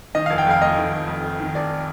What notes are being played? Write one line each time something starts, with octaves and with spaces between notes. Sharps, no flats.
D#3 D#5
F5
F1
G5
F2 F5
A3 D#5
D#3
F1
F2
A3
D#3
F1 D5